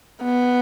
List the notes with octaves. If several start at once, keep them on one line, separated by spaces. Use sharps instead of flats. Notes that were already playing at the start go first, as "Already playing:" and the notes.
B3